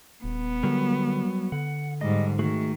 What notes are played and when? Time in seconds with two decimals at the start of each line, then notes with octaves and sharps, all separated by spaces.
0.24 D#1 B3
0.63 D3 F#3 G3 A#4
1.52 D3 F#5
2.01 G#2 G3 D#5
2.39 D#3 A3 F#4 G#4